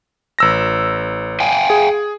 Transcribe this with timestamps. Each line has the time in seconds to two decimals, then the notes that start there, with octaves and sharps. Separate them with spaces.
0.39 A1 E6 A#6
1.40 F5 G5 G#5
1.70 G#4